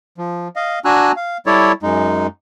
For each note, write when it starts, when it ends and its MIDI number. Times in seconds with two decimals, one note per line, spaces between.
0.18 0.48 53
0.56 0.79 75
0.56 0.79 77
0.85 1.12 62
0.85 1.12 66
0.85 1.12 80
0.85 1.12 82
0.85 1.12 88
0.85 1.12 90
1.16 1.37 77
1.46 1.72 55
1.46 1.72 64
1.46 1.72 69
1.46 1.72 73
1.46 1.72 74
1.83 2.27 42
1.83 2.27 56
1.83 2.27 63